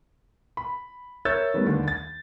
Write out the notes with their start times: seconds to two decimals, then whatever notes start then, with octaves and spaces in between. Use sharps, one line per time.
0.57 B5
1.25 A#4 C#5 E5 E6 G6 A6
1.54 D#3 G3 A3 B3
1.66 D#2 D3
1.88 A6